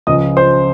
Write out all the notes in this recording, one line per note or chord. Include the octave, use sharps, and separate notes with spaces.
C#2 C#3 F3 D#5 D#6
C5 C6